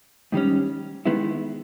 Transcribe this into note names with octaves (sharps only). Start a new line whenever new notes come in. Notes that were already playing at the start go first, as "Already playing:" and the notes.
G#2 D#3 G3 C#4
D#3 G#3 B3 E4